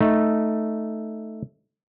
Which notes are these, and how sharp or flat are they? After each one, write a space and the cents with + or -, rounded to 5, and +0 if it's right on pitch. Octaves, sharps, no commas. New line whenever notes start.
A3 +0 D#4 +0